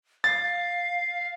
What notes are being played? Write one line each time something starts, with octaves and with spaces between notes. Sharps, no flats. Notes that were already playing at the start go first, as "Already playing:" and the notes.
F5 A6